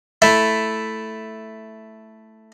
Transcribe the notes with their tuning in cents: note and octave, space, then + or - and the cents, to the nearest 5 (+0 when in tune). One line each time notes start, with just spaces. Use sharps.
A3 +0 E4 +0